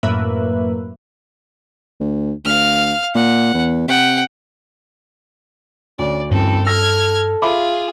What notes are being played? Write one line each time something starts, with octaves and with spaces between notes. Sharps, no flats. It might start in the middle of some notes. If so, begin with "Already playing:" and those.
F#2 A2 A#3 B4 E5 F#6
D2
D2 F5 F6
A#2 F#5
E2
C3 F#5 G5
D2 C#4 D5
G2 E3 C4 C#4 A4
A4 E6 F6 G#6 A#6
F4 G#4 E5 B5 D6